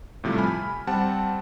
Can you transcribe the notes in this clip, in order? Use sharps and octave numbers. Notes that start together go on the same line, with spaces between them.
A2 C3 F3 G3 A3
G#5 B5 F6
G3 C4 F#5 A5